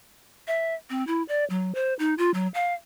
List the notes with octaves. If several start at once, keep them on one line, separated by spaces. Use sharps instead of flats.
E5
C4
E4
D5
F#3
C5
D#4
F4
F#3
F5